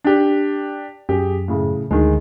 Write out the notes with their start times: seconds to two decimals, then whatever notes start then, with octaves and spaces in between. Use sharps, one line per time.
0.04 D4 G4
1.09 F#2 G4 G#4
1.48 A2 C#3
1.91 D2 D#3 G#3